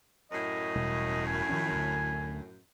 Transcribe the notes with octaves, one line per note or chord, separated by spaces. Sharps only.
F#2 A2 D#5
E1 B2 G3
G#5
D#3 F3 C#4
D2 D3